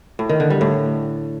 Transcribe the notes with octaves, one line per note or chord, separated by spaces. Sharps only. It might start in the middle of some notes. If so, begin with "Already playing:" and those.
A2
D#3
D3
G3
A2